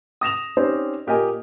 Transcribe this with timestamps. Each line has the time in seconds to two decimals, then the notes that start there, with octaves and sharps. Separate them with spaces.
0.21 D#6 A#6 E7 F7
0.57 C4 C#4 D#4 G4 C5 D5
1.07 A#2 G4 A#4 D#5 G#5